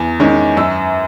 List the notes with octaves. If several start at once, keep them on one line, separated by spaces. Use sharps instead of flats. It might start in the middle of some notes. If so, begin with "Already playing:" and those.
Already playing: E2
D#3 G#3 C#4
F#2 E6